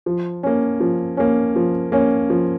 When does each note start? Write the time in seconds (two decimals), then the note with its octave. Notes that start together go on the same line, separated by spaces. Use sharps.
0.06 F3
0.43 A#3 C#4
0.80 F3
1.17 A#3 C#4
1.56 F3
1.92 A#3 C#4
2.30 F3